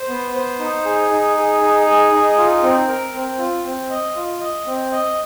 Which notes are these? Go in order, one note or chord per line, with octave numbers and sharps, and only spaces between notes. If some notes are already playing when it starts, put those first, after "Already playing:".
Already playing: C5
B3
C5
D#4
G#4
D#4
G#4
D#4
G#4
D#4
F4
C4
A#4
C4
F4
C4
D#5
F4
D#5
C4
D#5